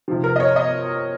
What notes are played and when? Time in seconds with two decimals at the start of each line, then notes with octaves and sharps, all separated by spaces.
0.08 C3 F3
0.24 A#4
0.36 D#5
0.40 C#5
0.56 D#5